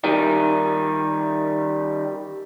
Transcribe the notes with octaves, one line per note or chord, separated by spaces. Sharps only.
D#3 G3 D#4